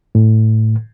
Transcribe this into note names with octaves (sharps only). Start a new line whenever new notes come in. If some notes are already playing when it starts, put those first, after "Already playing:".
A2